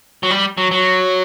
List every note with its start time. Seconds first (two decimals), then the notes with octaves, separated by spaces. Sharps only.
0.23 F#3
0.30 G3
0.58 F#3
0.71 F#3